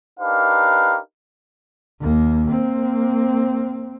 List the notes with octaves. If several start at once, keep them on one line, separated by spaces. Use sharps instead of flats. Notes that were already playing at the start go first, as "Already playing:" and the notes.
D4 D#4 G4 A#4 B4 F5
D#2 A#3
A#3 C4